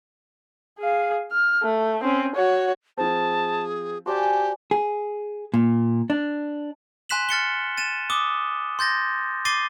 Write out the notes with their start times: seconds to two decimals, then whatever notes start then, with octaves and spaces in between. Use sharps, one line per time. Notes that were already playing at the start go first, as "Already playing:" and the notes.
0.78 G#4 F5
1.31 F6
1.62 A3
2.03 C4 C#4
2.35 F#4 C#5
2.97 F3 C4 G#4 A5
4.06 F#4 G4 C5 D5 G#5 A5
4.71 G#4
5.54 A#2
6.10 D4
7.09 G#5 C6 F#6 B6 E7 F#7
7.29 F6 A6 C#7 G7
7.77 A6 D#7 E7
8.10 D6 D#6 G7
8.79 C6 G6 A6 A#6
9.45 D6 A6 C7 D#7 G7